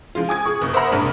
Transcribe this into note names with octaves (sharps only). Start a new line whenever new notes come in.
C#3 F3 G#3 F4
G#5 D#6 G#6
G#4 C#6
F#1 C#6
A#4 C5 E5 F#5 A#5 B5
F#1 C2 G#2 C3 D4 F6